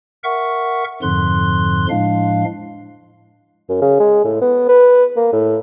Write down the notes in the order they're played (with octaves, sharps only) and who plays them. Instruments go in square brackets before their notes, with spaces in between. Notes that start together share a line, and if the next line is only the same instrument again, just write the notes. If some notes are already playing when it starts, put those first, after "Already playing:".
[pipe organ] A#4 E5 F#5 C#6
F2 G#2 D3 F3 C6 F#6
A2 F3 G#3 D4 F5
[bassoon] F#2
C#3
G#3
A2
B3
B4
A#3
A2